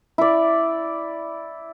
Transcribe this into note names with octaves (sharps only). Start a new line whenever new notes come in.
E4 D5